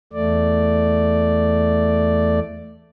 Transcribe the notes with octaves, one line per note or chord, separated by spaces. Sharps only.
E2 A3 D5